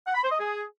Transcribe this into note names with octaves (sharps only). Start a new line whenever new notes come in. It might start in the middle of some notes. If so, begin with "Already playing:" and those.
F#5
B5
C5
D#5
G#4